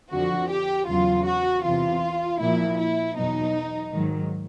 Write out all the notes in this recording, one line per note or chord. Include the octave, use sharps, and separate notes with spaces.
F2 D3 F3 F#4
G4
E2 C#3 F#3 F4
F#4
E2 C3 E3 F4
A#2 F3 E4
E4
E2 B2 F#3 D#4
G#2 D#3 F#3